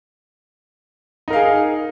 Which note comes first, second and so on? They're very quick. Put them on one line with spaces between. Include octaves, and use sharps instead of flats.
D#4 A#4 F5 G#4